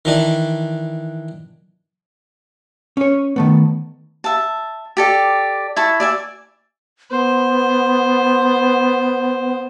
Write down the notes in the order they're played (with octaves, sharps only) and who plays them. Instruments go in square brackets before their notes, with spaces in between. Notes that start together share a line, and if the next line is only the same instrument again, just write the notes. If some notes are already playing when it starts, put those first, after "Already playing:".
[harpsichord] D#3 E3 D4
[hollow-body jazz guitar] C#4 C#5
D#3 A3 B3
[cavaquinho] E5 A5
G4 A4 D5
E4 A5 C#6
D5 E5 G#5
[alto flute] B3 [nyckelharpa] C5